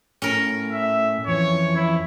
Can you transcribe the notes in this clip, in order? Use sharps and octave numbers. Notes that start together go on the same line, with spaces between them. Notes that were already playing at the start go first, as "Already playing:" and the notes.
A2 C#4 A#4
E5
F2 E3 C#5
E4